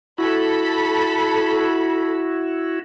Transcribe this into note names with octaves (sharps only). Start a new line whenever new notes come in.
E4 F#4 A4 B5